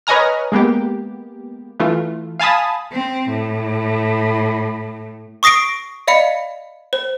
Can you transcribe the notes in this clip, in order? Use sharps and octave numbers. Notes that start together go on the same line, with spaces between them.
B4 C#5 D#5 G#5 A#5 F6
G#3 A#3 B3 G4
E3 A3 F4
F5 G#5 A5 B5 D#6
C4
A2
C#6 D#6 A#6 C7 D7
D5 D#5 F5 B5 C#7
C5